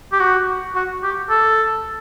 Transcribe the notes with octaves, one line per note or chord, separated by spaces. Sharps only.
G4
F#4
F#4
G4
A4